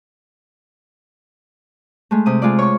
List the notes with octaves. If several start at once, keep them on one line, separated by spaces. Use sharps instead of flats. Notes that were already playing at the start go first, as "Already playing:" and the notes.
G#3 A3
C3 D#6
G#3 F4 D5
C#5 C#6